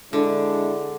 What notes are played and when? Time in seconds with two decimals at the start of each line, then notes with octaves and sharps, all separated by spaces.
0.13 D3 G#3 D4 E4